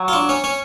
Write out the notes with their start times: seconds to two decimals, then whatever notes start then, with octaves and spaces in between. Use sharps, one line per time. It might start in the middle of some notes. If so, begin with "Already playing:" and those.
Already playing: F#3
0.08 F4
0.13 D4
0.29 C#4
0.44 C#4